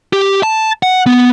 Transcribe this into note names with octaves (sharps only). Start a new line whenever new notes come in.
G4
A5
F#5
B3